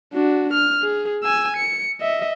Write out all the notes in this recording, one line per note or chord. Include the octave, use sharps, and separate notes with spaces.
D4 F#4
F6
G#4
G#5 E6
C#7
D#5 E5